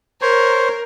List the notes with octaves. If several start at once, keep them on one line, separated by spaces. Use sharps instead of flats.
A#4 C5 C#5